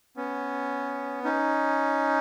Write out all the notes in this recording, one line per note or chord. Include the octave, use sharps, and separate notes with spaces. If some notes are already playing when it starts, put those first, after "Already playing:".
B3 C#4
C#4 D#4